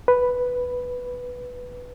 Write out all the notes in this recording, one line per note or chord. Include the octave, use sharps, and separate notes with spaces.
B4